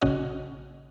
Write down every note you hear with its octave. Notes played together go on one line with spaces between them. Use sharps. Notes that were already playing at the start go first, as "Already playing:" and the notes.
A#1 C#3 C#4 F#4 D#5